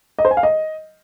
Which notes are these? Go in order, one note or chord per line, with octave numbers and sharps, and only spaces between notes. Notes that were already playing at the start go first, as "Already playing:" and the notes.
D#5
C5
G#5
F5
D#5